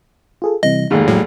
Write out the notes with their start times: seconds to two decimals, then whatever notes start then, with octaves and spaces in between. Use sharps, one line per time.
0.42 F4 G#4 A4
0.63 C3 E3 G3 D#5
0.91 F1 D#2 G#2 D#3
1.08 A2 F#3